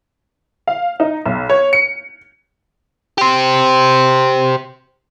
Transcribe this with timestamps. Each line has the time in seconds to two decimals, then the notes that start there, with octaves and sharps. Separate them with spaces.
0.67 F5
1.00 D#4
1.26 B1
1.50 C#5
1.73 C#7
3.18 G4 C5